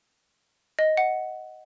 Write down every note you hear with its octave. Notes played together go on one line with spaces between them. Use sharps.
D#5
F#5